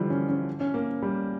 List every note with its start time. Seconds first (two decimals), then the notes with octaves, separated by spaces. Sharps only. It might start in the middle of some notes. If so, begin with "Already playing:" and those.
Already playing: D3 E3 F3 G3
0.10 C#4
0.29 C#4
0.60 C#4
0.74 A#3
1.02 G3